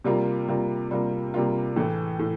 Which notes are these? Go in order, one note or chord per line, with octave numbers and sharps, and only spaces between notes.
C3 G3 A#3 F4
C3 G3 A#3 F4
C3 G3 A#3 F4
C3 G3 A#3 F4
A2 E3 A3
A2